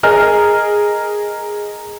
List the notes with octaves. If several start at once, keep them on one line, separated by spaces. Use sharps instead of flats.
G#4 A#4 D#5 F6